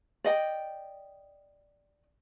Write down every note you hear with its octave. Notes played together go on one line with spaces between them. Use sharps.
D5 D#5 G5